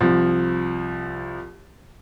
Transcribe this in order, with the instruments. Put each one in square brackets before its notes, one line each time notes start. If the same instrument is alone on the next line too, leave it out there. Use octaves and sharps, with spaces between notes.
[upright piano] C2 F3